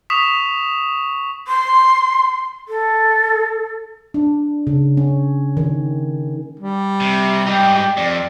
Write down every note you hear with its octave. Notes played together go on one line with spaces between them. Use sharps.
C#6 D#6 B6 E7 F7
C6
A4
D4
C#3
C#4
D#3
G3
C3
G#2 D#4 G4
F2 D5